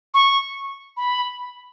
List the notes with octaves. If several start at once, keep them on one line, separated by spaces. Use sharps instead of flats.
C#6
B5